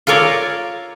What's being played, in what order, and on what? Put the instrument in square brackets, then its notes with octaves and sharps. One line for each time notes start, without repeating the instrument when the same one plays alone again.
[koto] F4 A4 A#4 C#5 D5